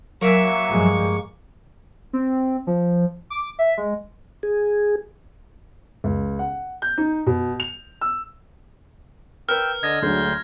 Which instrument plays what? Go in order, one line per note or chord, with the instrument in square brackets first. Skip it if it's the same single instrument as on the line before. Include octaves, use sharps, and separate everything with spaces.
[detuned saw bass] F#3 [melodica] A#3 C#6 [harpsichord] A#4 E5 G#5
[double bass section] G2 F3 G#3
[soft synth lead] C4
F3
D6
E5
G#3
[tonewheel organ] G#4
[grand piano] C#2
F#5
G6
D#4
B2
F7
E6
[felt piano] A#4 B4 [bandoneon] G5 E6 [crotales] F6
[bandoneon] D3 D#5 [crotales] G#6 A#6
[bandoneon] D2 C6 G6 [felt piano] F#3 G#3 D4